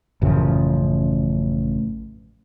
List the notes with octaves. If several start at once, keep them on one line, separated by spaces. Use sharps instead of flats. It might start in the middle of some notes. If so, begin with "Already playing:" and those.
A1 F#2 C#3 F3